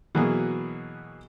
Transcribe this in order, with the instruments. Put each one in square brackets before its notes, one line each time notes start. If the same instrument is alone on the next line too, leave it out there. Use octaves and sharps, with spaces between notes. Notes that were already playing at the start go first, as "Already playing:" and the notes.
[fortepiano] B2 E3 F#3 A#3 G#4